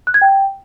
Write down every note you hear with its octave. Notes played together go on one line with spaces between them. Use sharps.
F#6
G#6
G5